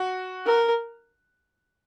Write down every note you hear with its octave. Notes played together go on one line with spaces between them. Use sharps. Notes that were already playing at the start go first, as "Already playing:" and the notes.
Already playing: F#4
A#4